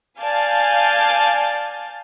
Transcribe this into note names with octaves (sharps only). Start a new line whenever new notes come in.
D5 F5 G#5 A5 G6 A6